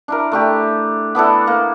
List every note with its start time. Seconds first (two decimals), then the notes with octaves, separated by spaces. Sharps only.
0.08 D4 E4 A#4
0.32 A3 D4 G4
1.15 B3 D4 E4 A4
1.47 A#3